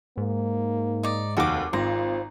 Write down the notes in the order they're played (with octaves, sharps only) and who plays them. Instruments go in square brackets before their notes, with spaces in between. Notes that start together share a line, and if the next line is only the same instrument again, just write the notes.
[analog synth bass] G#2 [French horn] A#3
[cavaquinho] D#4 D5
[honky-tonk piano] F1 D#2 [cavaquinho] F#4 D6
[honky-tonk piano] G#1 [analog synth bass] C4 [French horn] F4 [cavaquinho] A#5